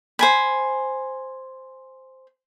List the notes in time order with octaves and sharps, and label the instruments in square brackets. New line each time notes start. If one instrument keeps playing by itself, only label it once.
[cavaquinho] C5 G#5 B5